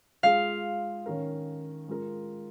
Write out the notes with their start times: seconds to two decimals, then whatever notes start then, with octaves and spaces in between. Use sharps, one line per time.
0.23 G#3 F4 G#4 F5
1.06 D#3 C#4 A#4
1.88 G#3 F4 A#4